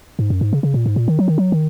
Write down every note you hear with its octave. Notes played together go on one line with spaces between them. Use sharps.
G#2
F#2
G#2
C#3
C#3
A#2
G#2
A#2
D#3
F#3
D#3
F#3
D#3